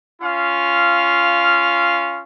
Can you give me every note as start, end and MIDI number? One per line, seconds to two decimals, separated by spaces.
0.21 2.21 61
0.21 2.21 65
0.21 2.21 77